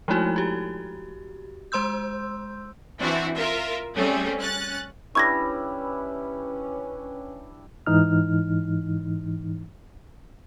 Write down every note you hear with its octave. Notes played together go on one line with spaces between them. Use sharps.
F3 G#3 A3 D#4 E4 F#4
F#4 G4
G#3 C5 C6 E6 G6
E3 C4 D4 E4 F#4
F4 A#4 E5
G3 A3 C4 C#4 G#4
C#4 F#6 A6
G3 C#4 D4 E4 B4 C#6 G#6 A#6
G#2 E3 D#4 F6